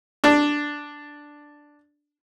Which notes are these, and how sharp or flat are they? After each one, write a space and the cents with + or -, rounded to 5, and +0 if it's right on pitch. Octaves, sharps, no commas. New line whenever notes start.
D4 +0 D5 +0